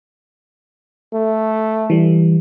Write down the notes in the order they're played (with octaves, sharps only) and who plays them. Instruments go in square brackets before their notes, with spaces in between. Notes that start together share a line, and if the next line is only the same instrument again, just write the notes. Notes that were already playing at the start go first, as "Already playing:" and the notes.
[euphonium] A3
[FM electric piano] E3 G3